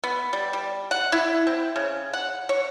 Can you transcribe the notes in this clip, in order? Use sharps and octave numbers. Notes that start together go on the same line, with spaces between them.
B3
G3
G3
F#5
E4
C4
C#3
F#5
C#5